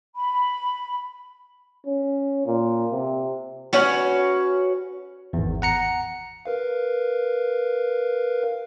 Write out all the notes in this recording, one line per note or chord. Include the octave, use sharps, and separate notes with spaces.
B5
C#4
A#2
C3
C#4 F#4 B4
G#1 E2
F#5 A#5 C#7
A#4 B4 F5